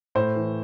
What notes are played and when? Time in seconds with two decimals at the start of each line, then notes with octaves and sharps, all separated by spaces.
0.15 A2 C5
0.36 E3